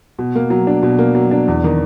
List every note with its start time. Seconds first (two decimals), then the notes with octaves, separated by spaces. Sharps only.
0.19 B2
0.35 A#3
0.50 F#3
0.67 D4
0.83 B2
0.99 A#3
1.15 F#3
1.31 D4
1.48 E2
1.64 D#3